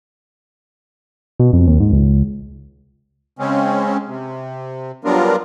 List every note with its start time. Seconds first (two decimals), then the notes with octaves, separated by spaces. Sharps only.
1.40 B2
1.53 F2
1.67 D#2
1.80 G#2
1.92 C#2
3.39 C#3 G#3 C4 C#4
4.07 C3
5.05 F#3 G3 B3 D4 F4 A#4